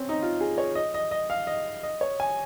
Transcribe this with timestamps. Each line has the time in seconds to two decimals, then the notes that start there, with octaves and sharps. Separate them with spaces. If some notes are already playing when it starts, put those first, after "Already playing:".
Already playing: C4 C#4
0.09 D#4
0.22 F4
0.41 G#4
0.58 C#5
0.75 D#5
0.94 D#5
1.11 D#5
1.30 F5
1.47 D#5
1.83 D#5
2.01 C#5
2.20 G#5